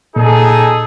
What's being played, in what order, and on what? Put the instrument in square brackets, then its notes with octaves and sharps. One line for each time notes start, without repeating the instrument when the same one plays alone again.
[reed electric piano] A#2 [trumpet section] D#4 G#4 [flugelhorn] A4